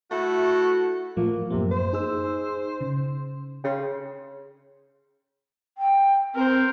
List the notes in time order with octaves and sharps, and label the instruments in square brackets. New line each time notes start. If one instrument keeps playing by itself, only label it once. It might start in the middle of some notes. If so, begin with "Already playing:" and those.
[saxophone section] A3 E4 F#4
[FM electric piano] A2 F3 A3 [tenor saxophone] A#3
[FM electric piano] F#2 A#3 [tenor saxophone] C3
[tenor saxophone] C5
[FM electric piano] D#4 G#4 E6
C#3
[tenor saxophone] C#3 [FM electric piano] G5 C6
[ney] G5
[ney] C4 [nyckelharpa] A#4 C5